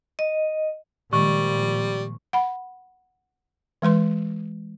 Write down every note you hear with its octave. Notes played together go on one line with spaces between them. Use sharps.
D#5
A#2 D#3 F3 G3 G#3 C#6
F#5 B5
E3 G#3 B4 C6